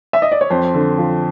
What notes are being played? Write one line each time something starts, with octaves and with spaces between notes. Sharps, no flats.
E5
D#5
D5
C#5
F2 C5
D3
F3